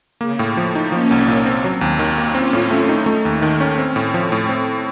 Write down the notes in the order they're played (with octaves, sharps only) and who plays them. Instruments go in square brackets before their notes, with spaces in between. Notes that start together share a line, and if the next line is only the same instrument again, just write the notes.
[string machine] C#3 [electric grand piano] A#3
[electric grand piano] A2
F3
D#4
[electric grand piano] F3 [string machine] A#3 C#4
[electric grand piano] C2
A#2
C4
F#3
D#2
D#3
A#3
[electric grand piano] C4 [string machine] C#4 F4
[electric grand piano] A2
A3
D#4
A3
D#2
D#3
C#4
C4
A2
F3
A2
C4